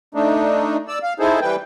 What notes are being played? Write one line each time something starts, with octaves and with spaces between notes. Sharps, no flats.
A3 D4 D#4
D5 E6
F5
D#4 E4 G#4 A4 C5
E3 G3 B4 G5